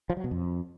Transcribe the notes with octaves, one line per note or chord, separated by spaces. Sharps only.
F3
F#3
B2
F2